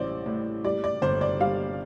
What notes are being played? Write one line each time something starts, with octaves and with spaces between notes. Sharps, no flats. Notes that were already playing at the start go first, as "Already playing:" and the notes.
Already playing: A1 G3 C5 D5
A2
G3 D5
D5
G1 C5
D5
G3 F5